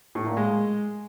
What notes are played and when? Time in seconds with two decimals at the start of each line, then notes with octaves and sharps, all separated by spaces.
0.15 A2
0.26 A#2
0.37 G#3